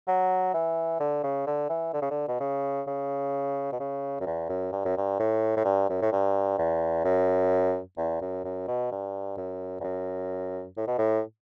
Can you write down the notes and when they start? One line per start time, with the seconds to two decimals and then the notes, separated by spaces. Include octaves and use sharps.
0.08 F#3
0.54 E3
1.00 D3
1.23 C#3
1.47 D3
1.69 E3
1.94 D3
2.02 C#3
2.11 D3
2.28 B2
2.40 C#3
2.87 C#3
3.72 B2
3.80 C#3
4.21 F#2
4.26 E2
4.49 F#2
4.72 G2
4.85 F#2
4.97 G2
5.19 A2
5.57 A2
5.65 G2
5.89 F#2
6.02 A2
6.12 G2
6.58 E2
7.05 F#2
7.97 E2
8.21 F#2
8.44 F#2
8.68 B2
8.92 G2
9.37 F#2
9.80 E2
9.84 F#2
10.77 A2
10.87 B2
10.98 A2